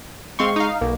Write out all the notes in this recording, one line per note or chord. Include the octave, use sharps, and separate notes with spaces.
G#3 C4 F5 C6 C#6
D#4 F5
B1 A#3